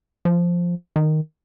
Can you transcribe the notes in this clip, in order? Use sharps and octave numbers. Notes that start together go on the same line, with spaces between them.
F3
D#3